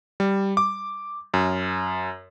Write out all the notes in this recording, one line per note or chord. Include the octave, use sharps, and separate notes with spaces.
G3
D6
F#2